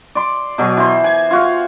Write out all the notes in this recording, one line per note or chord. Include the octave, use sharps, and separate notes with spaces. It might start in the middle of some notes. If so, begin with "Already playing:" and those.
D5 C6
B2 F#3 G#5
E3 C5
G#5
F4 F#4 F5